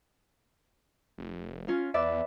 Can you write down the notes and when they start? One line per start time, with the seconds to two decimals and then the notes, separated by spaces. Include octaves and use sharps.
1.18 F1
1.68 C#4 F4
1.94 E2 B4 D5 E5